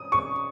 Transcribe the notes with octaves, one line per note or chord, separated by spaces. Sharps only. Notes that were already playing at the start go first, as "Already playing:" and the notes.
Already playing: D#6
C#6